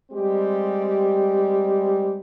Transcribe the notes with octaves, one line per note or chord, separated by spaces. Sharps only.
G3 G#3 C4 G4